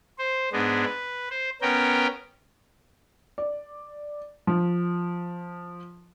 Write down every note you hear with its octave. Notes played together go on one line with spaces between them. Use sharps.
C5
G#2 G#3 B3 D4
B4
C5
B3 C#4 A#4 G5
D5
F3